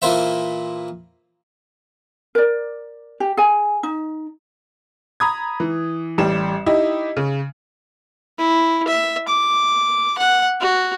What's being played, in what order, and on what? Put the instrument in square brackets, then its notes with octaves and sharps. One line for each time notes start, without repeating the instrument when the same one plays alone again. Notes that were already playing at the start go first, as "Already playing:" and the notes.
[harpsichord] A#2 E3 A#3 C5 E5
[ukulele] A#4 D5
G4
G#4 G#5
D#4
[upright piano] A#5 B5 D#6 G#6
E3
A1 G3 G4 E7
D#4 E4 G4 D#5
C#3
[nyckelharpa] E4
E5
D6
F#5
F#4